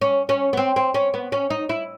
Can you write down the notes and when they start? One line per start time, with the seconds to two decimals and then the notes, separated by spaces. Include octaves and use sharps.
0.01 C#4
0.29 C#4
0.53 B3
0.57 C4
0.76 C4
0.94 C#4
1.14 B3
1.32 C#4
1.50 D#4
1.69 E4